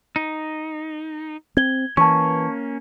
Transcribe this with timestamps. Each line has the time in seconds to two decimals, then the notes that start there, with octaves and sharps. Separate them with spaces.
0.16 D#4
1.57 C4 G#6 G7
1.97 E3 A#3 C#4 A5 C#6